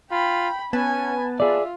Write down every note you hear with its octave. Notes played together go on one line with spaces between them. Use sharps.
F4 G5 B5
B3 C#4 B4 G#5 A5
F4 G#4 D5 E5